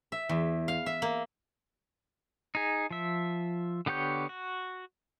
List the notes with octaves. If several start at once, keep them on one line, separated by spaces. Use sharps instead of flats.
E5
E2
F5
E5
A#3
D#4 G#4
F3 E5
D3 B3 G4 C#5 G6
F#4